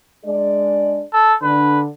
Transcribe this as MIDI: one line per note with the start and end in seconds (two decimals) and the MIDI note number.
0.24 1.03 56
0.24 1.03 62
0.24 1.03 74
1.13 1.35 69
1.42 1.86 50
1.42 1.86 62
1.42 1.80 71